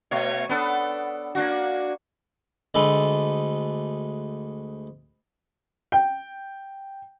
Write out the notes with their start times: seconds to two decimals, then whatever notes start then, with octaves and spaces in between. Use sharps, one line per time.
0.11 B2 A3 C#5
0.49 B3 D4 A4
1.35 A#3 D4 F#4
2.74 D2 G#3 A4 B4
5.92 G5